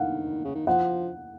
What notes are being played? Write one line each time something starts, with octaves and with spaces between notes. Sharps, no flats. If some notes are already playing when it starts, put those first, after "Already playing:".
Already playing: D#3 F5 F#5
C#3
D#3
F3 F#5